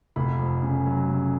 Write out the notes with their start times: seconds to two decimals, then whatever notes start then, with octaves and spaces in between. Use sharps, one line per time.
0.16 F1 B5
0.39 F2
0.63 C#3
0.86 F#3
1.09 C#3